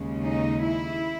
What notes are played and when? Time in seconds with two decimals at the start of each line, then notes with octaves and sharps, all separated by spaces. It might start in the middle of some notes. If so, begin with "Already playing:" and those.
Already playing: D#2 C#3 G#3
0.25 D#4
0.62 E4